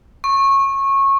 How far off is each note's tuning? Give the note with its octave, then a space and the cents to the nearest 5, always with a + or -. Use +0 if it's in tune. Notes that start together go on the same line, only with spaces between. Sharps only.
C#6 -20